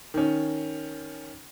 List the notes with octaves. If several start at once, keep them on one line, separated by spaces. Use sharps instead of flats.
D#3 C#4